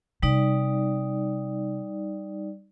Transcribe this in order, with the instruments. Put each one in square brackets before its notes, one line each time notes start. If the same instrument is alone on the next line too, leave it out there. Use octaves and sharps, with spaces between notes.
[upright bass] C3 [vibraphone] G3 D#4 D5